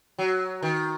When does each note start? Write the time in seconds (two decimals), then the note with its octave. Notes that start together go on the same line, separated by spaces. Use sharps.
0.18 F#3
0.63 D#3